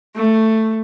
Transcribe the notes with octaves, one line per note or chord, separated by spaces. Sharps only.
A3